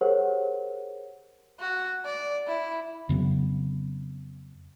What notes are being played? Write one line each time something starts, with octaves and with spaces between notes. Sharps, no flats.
G4 G#4 A#4 C5 C#5 F#5
F#4
D5
E4
F2 C#3 F#3 B3